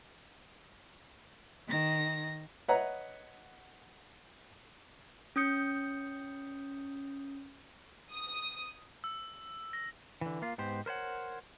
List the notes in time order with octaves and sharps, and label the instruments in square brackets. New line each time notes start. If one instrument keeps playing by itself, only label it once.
[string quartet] D#3 A#6
[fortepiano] B4 C#5 D#5 E5 F#5 A#5
[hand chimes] C#4 D#6 G6 C#7
[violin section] D#6
[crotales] E6
A#6
[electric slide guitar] D3 E3
A#3 F4
G#2 B3 G4 C5
A#4 C5 C#5 F#5